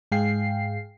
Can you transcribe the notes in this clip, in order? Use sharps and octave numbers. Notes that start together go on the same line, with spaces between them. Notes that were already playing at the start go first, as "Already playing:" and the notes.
G#2 G#3 G#4 F5 G5 C7